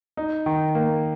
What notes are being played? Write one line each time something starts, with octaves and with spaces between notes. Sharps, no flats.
D#4
D#3
A#3